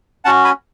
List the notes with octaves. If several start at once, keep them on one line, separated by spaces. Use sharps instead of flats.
C#4 F#4 F#5 A5
G#5 B5